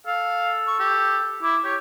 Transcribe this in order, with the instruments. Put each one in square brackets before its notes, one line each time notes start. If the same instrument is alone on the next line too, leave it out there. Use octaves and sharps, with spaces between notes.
[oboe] A4 [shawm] F5
[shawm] C#6
G4
[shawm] E4 [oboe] D6
[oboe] G4 [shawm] C#5